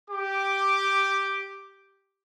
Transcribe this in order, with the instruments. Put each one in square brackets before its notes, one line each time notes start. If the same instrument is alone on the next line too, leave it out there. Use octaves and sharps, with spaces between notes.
[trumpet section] G4 D6